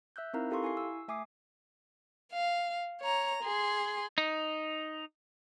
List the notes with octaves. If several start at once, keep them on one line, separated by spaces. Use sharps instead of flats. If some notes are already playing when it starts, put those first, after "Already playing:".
E5 E6 F#6 G6
C4 D#4 E4 A#4 F5 A#5
E4 G4 A4 F5 C6 C#6
E4 G#5 C#6 C7
E6
A3 E5 G#5 D6 D#6 C7
F5
C#5 A#5
G#4 C6
D#4